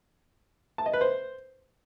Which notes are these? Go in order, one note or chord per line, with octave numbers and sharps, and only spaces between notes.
A5
D#5
B4
C5